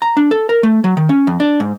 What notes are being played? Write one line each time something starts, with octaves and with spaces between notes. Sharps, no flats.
A#5
D4
A4
A#4
A3
F#3
D#3
C#4
F2
D4
G#2